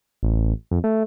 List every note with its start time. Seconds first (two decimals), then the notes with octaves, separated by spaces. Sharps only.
0.23 A1
0.71 F2
0.84 A3